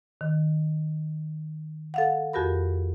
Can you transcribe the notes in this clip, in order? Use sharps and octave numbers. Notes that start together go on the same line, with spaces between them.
D#3
A4 F5 F#5
F2 F#4 G4 A#4 B5